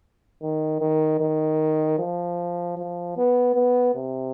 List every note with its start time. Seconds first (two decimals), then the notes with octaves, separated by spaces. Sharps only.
0.42 D#3
0.81 D#3
1.21 D#3
1.99 F3
2.77 F3
3.17 B3
3.55 B3
3.95 C3